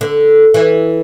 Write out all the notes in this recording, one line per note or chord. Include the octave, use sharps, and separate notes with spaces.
D3
E3